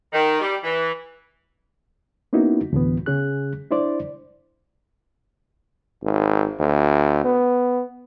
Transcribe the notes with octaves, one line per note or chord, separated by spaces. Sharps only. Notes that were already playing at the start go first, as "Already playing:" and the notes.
D#3
G3
E3
A#3 B3 C#4 D#4 E4 F#4
D2 A2 E3 B3
C#3 C#4 G#4 F#6
D4 E4 C5 D5
G#1
D2
B3